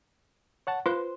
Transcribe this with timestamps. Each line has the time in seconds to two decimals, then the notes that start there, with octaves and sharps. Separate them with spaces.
0.67 C#5 F#5 A5
0.86 F4 B4 C5 C6